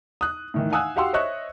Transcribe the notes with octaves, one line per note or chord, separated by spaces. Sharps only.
D#6 F#6
A2 D#3 E3
F5 F#5 G#5 D#6 E6 F#6
F#4 G4 F5 F#5 C6 E6
C5 C#5 D#5 E5 C#6 F#6